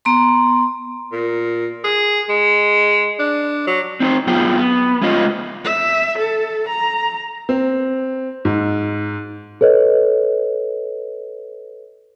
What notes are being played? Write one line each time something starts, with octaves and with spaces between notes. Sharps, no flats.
B3 A#5 C6
A#2
G#4
G#3
D4
F#3
C4 D#4 C5
G2 F#3 B3 F4 G#4 G5
B3
G#3 A3 C#4 F4 C5 D#5
E5
A4
A#5
C4
G#2
A4 B4 C#5 D#5